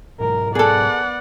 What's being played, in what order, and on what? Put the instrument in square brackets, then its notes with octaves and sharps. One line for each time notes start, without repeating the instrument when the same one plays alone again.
[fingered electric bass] G#2 B2 F#3 [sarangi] A#4
[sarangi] B3 [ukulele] G#4 A4 [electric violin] D5 F#5